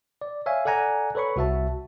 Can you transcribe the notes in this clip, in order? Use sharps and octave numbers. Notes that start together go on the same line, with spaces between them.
D5
C#5 E5 F5 G#5
A4 D5 F#5 G#5 A#5
A4 B4 C#5 B5 C#6
C2 F#4 E5 A5